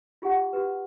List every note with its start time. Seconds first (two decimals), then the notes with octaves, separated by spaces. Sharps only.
0.22 F4 G4 G#4 F#5
0.53 F#4 G4 B4